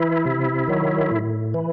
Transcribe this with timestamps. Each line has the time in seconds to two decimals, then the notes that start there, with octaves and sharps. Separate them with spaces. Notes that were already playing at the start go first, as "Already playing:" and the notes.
Already playing: E3 E4
0.25 C3
0.68 D#3 F#3
1.11 A2
1.54 E3